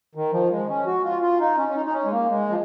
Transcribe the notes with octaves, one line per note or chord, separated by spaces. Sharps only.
D#3
F3
G#3
C#4
F#4
F4
F4
D#4
C#4
C#4
D#4
D#4
C#4
G#3
A#3
G#3
F3